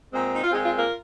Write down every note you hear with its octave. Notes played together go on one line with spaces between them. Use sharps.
A#2 G#3 C4
D#4
F4
A#2 G#3 C4 D#4 G#4
F4 A#4
F4 A#4